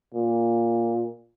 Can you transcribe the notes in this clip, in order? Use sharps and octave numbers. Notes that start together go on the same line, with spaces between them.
A#2